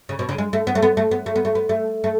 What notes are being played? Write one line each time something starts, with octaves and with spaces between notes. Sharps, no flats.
C#3
B2
C#3
G#3
A3
B3
A3
B3
A3
B3
A3
B3
A3
B3
A3
A3